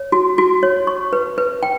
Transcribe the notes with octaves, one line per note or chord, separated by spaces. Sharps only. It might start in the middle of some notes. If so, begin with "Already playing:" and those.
Already playing: C#5
F#4
F#4
C#5
C#6
B4
B4
G5